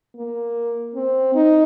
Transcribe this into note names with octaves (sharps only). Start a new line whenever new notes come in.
A#3
C4
D#4